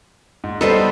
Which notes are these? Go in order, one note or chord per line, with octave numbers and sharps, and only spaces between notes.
G#2
G3 B3 D#4 A4 B4 C5